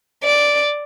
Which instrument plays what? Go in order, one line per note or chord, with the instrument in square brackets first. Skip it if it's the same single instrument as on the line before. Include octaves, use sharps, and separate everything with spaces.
[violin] D5